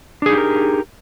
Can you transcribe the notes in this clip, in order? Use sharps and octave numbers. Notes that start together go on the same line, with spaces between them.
D4 D#4 G4 G#4 A#4